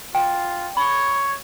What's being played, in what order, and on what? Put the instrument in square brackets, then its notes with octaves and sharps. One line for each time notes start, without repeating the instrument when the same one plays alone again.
[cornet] F4 [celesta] G5
[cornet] C#5 [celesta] B5